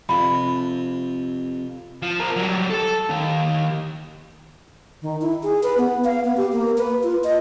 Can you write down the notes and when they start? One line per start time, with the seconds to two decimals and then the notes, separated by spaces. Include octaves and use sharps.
0.09 F2 C3 B5
2.02 F3
2.20 C4 A#4
2.36 F#3 G3
2.70 A4 A5
3.10 D#3 G4
5.02 D#3
5.21 E4
5.43 G#4
5.63 B4
5.77 B3
6.04 F5
6.24 B3
6.37 G4
6.52 A#3
6.78 B4
7.03 F4
7.24 D#5